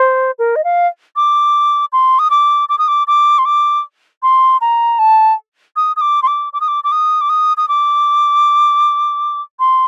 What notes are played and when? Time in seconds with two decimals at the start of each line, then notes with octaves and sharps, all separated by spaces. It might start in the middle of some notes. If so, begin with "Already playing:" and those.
Already playing: C5
0.38 A#4
0.56 D#5
0.64 F5
1.16 D6
1.92 C6
2.19 D#6
2.30 D6
2.69 D6
2.78 D#6
2.88 D6
3.07 D6
3.38 C6
3.45 D6
4.23 C6
4.61 A#5
4.99 A5
5.76 D#6
5.96 D#6
6.01 D6
6.22 C6
6.27 D6
6.53 D6
6.61 D#6
6.68 D6
6.84 D6
6.92 D#6
7.21 D6
7.29 D#6
7.57 D#6
7.68 D6
9.59 C6